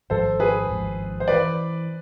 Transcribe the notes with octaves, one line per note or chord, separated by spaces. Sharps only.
G#1 G#2 F3 G#3 A4 C5
G#4 B4
G#1 G#2 F3 G#3
C5
E3 B4 D5